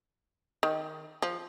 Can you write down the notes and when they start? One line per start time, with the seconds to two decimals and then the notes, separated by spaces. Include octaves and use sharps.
0.63 D#3
1.22 F3